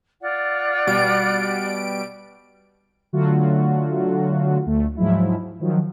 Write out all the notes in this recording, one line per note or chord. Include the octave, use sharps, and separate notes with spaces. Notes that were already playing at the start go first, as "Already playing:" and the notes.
F4 D5 F#5
B2 G3 D7
D3 F#3 A3 F4 F#4
D2 A3
G#2 F3 F#3 G#3 E4
D#3 F3 F#3